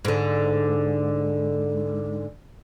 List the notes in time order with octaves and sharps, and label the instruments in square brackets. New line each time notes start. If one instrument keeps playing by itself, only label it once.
[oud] G#2 D3